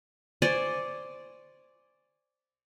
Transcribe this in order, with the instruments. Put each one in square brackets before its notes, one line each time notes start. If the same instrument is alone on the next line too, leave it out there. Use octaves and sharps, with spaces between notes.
[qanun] C5 D5 G#5 C#6